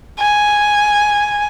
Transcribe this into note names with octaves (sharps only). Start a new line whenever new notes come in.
G#5